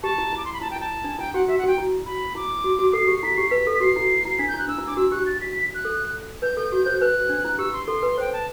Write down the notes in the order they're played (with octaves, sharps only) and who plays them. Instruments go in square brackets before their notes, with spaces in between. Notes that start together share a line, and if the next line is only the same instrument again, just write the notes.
[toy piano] G4 [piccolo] A5
[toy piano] E4
[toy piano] E4 [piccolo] D6
[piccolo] C6
B5
[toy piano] E4 [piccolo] A5
[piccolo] G5
[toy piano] E4 [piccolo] A5
[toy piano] D4
[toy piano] E4 [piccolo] G5
[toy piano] F#4 [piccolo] F#5
[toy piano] F#4 [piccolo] E5
[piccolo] F#5
[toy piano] F#4 [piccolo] G5
[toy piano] E4
[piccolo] B5
[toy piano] E4 [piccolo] D6
[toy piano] F#4
F#4
[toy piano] A4 [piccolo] C7
[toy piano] G4
[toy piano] E4 [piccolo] B6
[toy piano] G4 [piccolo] C7
[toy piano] B4 [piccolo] B6
[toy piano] A4
[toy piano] F#4 [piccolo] C7
[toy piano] E4
E4
[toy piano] D4 [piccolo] B6
[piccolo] G6
[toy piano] E4 [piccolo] F#6
[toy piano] D4 [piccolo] E6
[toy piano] E4
[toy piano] D4 [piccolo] D6
[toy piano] F#4 [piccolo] E6
[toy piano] G4 [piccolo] F#6
[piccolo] A6
B6
B6
F#6
[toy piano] A4
[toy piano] B4 [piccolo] G6
[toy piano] A4
F#4
C5
[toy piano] B4 [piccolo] F#6
[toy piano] D4
E4
[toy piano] G4 [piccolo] E6
[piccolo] C6
[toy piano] A4 [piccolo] C6
[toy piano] B4
[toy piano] C5 [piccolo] G5
[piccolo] A5